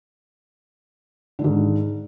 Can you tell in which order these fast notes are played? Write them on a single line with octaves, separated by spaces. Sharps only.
D3 D#3 G#2